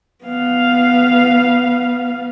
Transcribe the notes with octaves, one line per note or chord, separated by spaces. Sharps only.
B3 F5